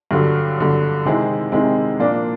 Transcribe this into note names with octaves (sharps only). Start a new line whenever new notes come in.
G2 D3 F#3
G2 D3 F#3
C3 D#3 G#3 C4 E4
C3 D#3 G#3 C4 E4
A#2 F3 A#3 D4